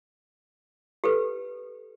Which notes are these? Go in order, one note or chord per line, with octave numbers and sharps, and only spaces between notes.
G4 A4 B4